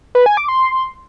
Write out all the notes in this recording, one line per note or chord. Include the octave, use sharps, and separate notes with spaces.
B4
G#5
D6
C6